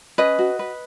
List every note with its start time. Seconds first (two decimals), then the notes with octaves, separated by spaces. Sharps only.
0.18 C#4 B4 D#5
0.39 F#4
0.59 B4